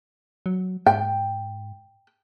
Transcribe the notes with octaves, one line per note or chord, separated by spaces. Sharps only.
F#3
G#2 G5